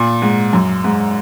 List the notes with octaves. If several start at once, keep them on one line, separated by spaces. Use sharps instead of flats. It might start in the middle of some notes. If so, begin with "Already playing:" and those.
Already playing: A#2
G#2
F#2
G#2